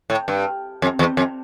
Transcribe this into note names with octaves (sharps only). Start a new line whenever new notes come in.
A2
G2
F2
E2
F2